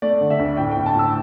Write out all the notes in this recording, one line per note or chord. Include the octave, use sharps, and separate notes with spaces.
A3 D5
D3
E5
D2
A2 G5
G5
A2
A5
A2 E6